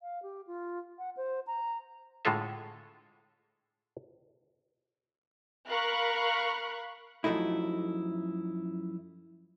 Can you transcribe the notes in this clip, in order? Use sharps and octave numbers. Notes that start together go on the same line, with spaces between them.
F5
G4
F4
F#5
C5
A#5
A2 D3 G#3 F4 A4 E5
A#4 F5 B5 C#6 F#6
F#2 F3 A3 D#4 E4